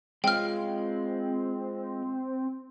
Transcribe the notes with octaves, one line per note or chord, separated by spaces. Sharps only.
G#3 C4 F4 G5 F6